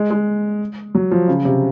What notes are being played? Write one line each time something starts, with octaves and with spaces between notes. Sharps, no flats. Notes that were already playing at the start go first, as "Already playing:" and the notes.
Already playing: G#3
G#3
F#3
F3
C#3
C3